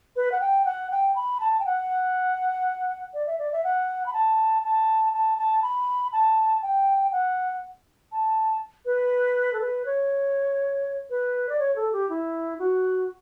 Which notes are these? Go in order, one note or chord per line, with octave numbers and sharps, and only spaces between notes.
B4
F#5
G5
F#5
G5
B5
A5
G5
F#5
D5
E5
D5
E5
F#5
B5
A5
A5
A5
A5
B5
A5
G5
F#5
A5
B4
A4
B4
C#5
B4
D5
C#5
A4
G4
E4
F#4